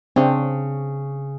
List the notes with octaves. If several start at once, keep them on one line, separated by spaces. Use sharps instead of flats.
C#3 C4 D4